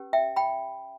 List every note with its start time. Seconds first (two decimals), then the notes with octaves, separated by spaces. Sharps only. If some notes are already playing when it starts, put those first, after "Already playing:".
Already playing: C#4 G4 B4
0.13 E5 G5
0.36 G5 B5